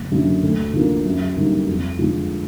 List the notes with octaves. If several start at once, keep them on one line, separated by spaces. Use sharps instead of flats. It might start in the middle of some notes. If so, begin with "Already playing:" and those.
Already playing: F#1
F#2 D3
D2
D3 F3 A#3
F#2
D3 G3 A#3 D#4
F2
D3 F3 G#3